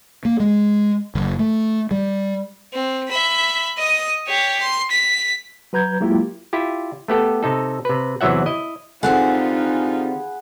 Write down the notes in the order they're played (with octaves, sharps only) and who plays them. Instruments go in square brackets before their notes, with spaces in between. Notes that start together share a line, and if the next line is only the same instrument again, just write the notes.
[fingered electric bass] A#3
G#3
F#1
A3
G3
[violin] C4
E5 B5
D#5 D#6
G4 C#5
C6
B6
[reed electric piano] F#3 B4 A#5 G6 G#6
F#3 G#3 A#3 E4 F4 G4
[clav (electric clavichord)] E4 F4 G4
A3 B3 G4 A4
C3 D#4 A4
C3 B4
E2 C3 E3 F#3 E5 F#5
E4 D#5
[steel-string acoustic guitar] D3 C4 G4 [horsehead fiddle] D#4 F4 [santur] G#4 B4 F#5